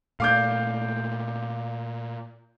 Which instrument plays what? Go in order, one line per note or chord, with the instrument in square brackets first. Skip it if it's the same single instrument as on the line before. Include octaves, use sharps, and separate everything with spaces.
[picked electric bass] A#2 A3 [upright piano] F5 D6 G6